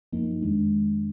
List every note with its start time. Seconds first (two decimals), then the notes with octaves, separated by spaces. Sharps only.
0.13 F#2 F3 A#3 D#4
0.42 F2 D#3 G#3 D4